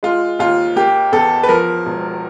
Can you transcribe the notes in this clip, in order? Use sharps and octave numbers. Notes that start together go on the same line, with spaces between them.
G#3 F4
D#2 F4
A#3 G4
E2 A4
B4
F3 A#4
E1